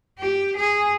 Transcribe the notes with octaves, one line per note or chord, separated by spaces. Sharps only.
G4
G#4